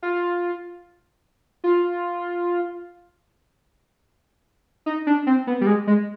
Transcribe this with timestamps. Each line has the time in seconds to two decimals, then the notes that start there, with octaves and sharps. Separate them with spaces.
0.03 F4
1.64 F4
4.86 D#4
5.07 D4
5.27 C4
5.47 B3
5.61 G3
5.67 G#3
5.87 G#3